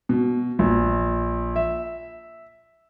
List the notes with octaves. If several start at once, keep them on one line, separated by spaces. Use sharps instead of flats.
B2
A#1
E5